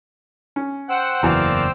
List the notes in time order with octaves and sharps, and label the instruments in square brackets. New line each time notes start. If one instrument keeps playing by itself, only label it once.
[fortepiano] C#4
[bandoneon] C5 G5 E6 [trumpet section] F#5
[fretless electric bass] F#1 E2 [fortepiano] E3 F#4 A#5 [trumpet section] A#4 D5 F5